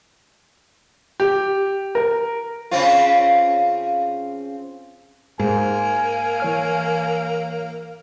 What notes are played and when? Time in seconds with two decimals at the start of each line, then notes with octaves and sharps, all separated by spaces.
1.20 G4
1.95 A#4
2.71 C#3 C4 F4
5.39 G#2 A#3 G#5
6.40 E3 C#5 F6